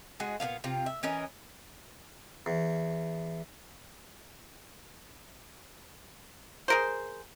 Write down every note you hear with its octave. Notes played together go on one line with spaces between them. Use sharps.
G#3 F#4 G#4
A#2 G3 B3 F5
C3 F4
E5
E3 C#4 A#4 D#5
E2
G#4 A#4 C5